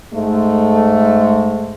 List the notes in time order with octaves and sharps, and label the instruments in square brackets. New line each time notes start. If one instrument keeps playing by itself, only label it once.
[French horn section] G#2 G#3 A3